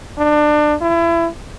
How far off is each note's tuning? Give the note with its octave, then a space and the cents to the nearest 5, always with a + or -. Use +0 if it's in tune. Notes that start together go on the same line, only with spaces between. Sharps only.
D4 +25
E4 +30